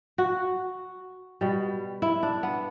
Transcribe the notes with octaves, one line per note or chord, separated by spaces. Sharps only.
F#4
B2 G3
E4
D4
B3